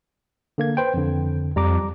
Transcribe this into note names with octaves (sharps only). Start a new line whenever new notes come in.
D3 A#3 G#6
B4 C5 G5
F2 D3
F2 G3 A#5 D6